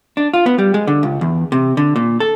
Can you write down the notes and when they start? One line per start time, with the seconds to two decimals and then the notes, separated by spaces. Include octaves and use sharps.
0.17 D4
0.33 F4
0.46 B3
0.59 G3
0.74 G#3
0.87 D3
1.03 C#2
1.21 E2
1.52 C3
1.77 D3
1.96 A#2
2.20 A4